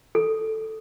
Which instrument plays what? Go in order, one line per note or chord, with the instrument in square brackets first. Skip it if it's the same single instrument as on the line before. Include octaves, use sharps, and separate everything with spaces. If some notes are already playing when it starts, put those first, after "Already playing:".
[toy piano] A4